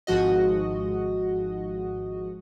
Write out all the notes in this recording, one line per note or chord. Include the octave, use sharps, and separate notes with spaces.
G#1 G#2 F3 F#4 D#5